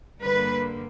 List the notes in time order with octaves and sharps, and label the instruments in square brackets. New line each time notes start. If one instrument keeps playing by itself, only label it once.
[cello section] G2 D3 G3 A#3 B4